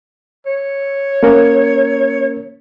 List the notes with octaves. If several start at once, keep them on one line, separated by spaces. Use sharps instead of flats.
C#5
A#3 C#4 A#4